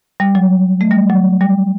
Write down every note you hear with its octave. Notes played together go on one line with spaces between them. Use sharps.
G3
F#3
A3
G3
F#3
G3